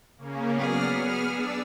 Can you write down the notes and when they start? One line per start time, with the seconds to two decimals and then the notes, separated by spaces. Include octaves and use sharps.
0.18 C#3 A#3 C#4
0.55 F#3 B3 G#4 D5 F6
0.97 F6
1.33 D4 D5 E6